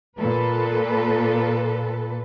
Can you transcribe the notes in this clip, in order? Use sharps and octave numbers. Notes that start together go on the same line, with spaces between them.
A#2 A4 B4